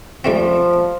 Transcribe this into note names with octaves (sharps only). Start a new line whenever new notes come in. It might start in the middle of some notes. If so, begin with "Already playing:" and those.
F3 G3 A3 C4